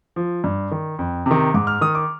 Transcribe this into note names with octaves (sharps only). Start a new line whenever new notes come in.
F3
G2
D#3
F2
C3 D#3
G#2 D6
F6
D#3 D#6
D6